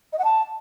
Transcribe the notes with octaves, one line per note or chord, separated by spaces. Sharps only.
D#5
F#5
A5